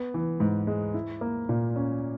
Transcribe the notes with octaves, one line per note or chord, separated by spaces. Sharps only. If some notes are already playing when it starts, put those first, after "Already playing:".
Already playing: B3
E3
G#2
G#3
E4
A#3
A#2
C#4